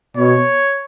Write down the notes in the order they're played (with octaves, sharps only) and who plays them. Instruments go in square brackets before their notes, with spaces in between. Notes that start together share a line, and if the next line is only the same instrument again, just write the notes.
[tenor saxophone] B2 [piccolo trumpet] C#5